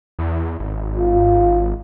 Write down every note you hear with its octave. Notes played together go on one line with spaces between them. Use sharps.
E2
G#1
F4